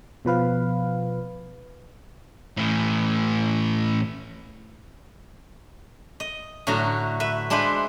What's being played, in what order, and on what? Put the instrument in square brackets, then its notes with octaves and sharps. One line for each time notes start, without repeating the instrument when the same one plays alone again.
[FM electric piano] B2 F3 B4 F5
[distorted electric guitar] A2 E3
[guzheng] D#5
A2 D3 F#3 F#4 A#5
B4 E5
G#3 D4 E4 B4 C5